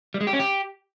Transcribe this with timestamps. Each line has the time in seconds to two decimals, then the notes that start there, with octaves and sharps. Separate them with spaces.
0.14 G3
0.21 G#3
0.27 G4
0.33 C#4
0.39 G4